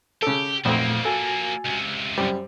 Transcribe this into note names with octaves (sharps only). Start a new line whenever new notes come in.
C#3 G4 A4
B1 F2 A#2 F3 A3 A#3 C4
F#4 A4 G#5 A6
C#2 C3
F#2 G3 C5